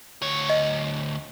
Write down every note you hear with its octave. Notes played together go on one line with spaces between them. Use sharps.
D2 C#5
D#5